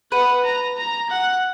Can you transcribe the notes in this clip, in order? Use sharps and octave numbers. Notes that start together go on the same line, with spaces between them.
B4 F#5
A#5
A#5
F#5